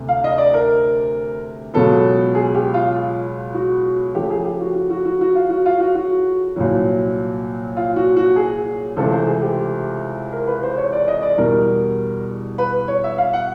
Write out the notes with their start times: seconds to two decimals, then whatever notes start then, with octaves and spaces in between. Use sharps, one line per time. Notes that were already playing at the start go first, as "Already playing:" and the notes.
Already playing: D2 C3
0.09 F5
0.24 D#5
0.38 D5
0.54 A#4
1.74 C#2 B2 F#3 B3 A4
2.35 G#4
2.54 G4
2.74 F4
2.94 F4
3.54 F#4
4.15 C#3 F3 A3 G4
4.30 G#4
4.45 G4
4.61 F#4
4.75 F#4
4.90 F#4
5.05 F#4
5.21 F#4
5.36 F4
5.50 F#4
5.66 F4
5.80 F#4
5.95 F#4
6.56 C2 A#2 F#3
7.77 F4
7.96 F#4
8.17 F#4
8.36 G#4
8.96 C#2 C3 E3 A3 C4 A4
9.12 C5
9.27 G#4
9.42 G4
10.32 A#4
10.47 B4
10.63 C5
10.77 C#5
10.93 D5
11.08 D#5
11.22 D5
11.38 E2 B2 G3 A#4
12.58 B4
12.88 C#5
13.04 E5
13.18 F5
13.33 F#5